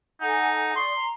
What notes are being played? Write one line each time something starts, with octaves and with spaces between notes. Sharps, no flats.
D#4 A4 F#5 G#5
D5 C6 C#6 D#6
A#5